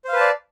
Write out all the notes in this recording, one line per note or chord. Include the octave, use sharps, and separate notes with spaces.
B4 C5 D5 F5 A5